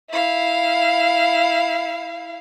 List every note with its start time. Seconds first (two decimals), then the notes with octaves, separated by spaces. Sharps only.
0.10 E4 F5